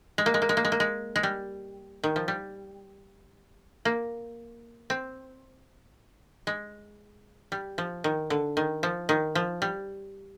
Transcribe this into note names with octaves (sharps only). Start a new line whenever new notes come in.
G#3
A#3
G#3
A#3
G#3
A#3
G#3
A#3
G#3
G#3
G3
D#3
F3
G3
A#3
C4
G#3
G3
F3
D#3
D3
D#3
F3
D#3
F3
G3